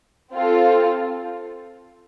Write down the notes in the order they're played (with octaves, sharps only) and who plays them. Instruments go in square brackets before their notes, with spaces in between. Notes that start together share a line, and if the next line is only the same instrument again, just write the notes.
[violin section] C4 F4 A4